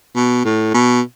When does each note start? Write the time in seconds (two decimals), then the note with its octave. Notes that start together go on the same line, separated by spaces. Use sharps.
0.15 B2
0.44 A2
0.74 B2